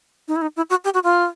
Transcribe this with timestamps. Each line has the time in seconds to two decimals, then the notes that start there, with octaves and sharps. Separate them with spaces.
0.28 D#4
0.36 E4
0.42 D#4
0.56 E4
0.70 F#4
0.84 G4
0.94 F#4
1.04 F4